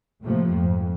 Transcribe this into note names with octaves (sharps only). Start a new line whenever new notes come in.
A2 C3 F3 A3 A#3
F2 G#2